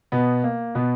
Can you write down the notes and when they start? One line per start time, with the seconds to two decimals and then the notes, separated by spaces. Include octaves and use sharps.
0.12 B2 B3
0.44 A#3
0.75 B2 B3